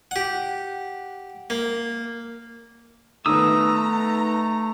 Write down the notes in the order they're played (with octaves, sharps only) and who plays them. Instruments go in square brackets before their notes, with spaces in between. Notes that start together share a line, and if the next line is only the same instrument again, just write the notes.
[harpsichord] G4 F#5
A#3
[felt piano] D#3 B3 [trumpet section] A3 [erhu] A#5 [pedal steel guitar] D#6 E6